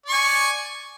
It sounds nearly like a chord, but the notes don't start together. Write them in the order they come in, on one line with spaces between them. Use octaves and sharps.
D5 C#6 G#5